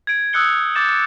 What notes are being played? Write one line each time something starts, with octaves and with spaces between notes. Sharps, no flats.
G#6 D7
D#6 E6 F#6 G6 C#7 G7
D6 G6 A6 E7